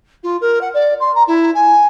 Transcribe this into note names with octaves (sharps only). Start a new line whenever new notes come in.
F4
A#4
F#5
D5
C6
A#5
E4
G#5